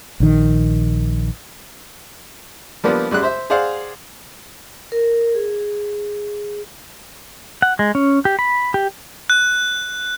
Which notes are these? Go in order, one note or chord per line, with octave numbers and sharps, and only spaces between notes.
A#1 D#3
F3 G3 A#3 B3 D4
F#2 G3 G#3 F#6
C5 E5
G#4 C5 D5 F5 F#5
A#4
G#4
F#5
G#3
C#4
G4
B5
G4
F#6